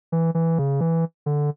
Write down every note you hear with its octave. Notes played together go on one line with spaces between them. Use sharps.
E3
E3
C#3
E3
D3